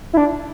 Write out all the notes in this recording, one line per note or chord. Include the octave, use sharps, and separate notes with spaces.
E4
D4